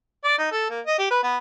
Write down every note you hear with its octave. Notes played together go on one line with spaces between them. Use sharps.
D5
D#4
A4
A#3
D#5
G4
B4
B3